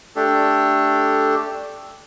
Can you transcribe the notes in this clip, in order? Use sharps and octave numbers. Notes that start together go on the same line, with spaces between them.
A3 D4 G4 A4